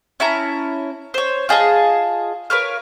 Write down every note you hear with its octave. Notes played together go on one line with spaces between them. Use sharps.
C#4 E4 A5 A#5
C5 C#5
F4 G#4 D#5 A5
A#4 B4 C#5 F5